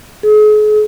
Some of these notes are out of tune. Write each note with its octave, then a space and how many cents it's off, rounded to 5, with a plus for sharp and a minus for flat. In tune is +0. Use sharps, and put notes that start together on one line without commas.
G#4 +40